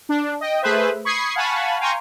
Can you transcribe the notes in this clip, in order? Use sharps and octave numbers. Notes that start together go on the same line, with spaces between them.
D4
D#5 G5
A3 G#4 B4 C5 E5
B5 C#6 D#6 G#6 C7
F5 F#5 G#5 A5 B5 C#6
F5 G5 G#5 A#5 C6 C#6